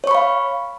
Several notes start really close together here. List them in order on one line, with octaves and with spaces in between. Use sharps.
C#5 C#6 B5 F5